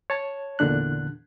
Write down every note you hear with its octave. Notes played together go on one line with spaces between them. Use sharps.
C#5 A5
E2 A#2 D3 D4 F#6